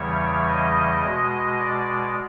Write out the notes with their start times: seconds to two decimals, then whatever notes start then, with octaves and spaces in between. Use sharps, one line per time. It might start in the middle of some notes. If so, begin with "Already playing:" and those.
Already playing: E2 C#3 E3 G3 C#5
0.47 D#5
1.03 B2 G#3
1.59 D5